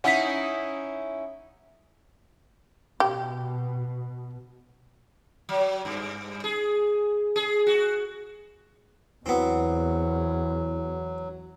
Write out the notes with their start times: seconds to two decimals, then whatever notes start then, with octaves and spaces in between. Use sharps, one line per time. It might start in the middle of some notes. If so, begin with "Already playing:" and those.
0.04 C#4 D#4 E4 F#5 B6
3.00 B2 G4
5.49 F#3
5.85 G2
6.44 G#4
7.36 G#4
7.67 F#4
9.26 E2 F#3 B3 C4 E4 F#4